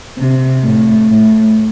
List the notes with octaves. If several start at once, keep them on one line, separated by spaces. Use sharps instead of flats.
C3
A2
A2